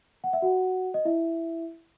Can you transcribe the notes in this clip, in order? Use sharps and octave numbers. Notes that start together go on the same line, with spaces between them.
F#5
E5
F#4 F#5
D#5
E4 E5